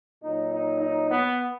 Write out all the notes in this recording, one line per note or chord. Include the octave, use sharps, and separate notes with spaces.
A#2 F#3 D#4
D#4
D#4
B3